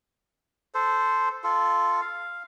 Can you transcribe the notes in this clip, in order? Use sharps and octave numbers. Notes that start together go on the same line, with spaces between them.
A4 C5
F4 A4
F5